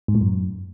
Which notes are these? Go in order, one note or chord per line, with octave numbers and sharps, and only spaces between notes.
G#2
A2
F#2